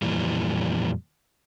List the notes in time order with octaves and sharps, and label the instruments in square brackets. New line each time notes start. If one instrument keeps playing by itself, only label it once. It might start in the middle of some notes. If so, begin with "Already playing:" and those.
[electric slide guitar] F2 A#2 E3 G3